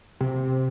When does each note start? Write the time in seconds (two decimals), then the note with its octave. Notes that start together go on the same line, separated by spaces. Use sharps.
0.21 C3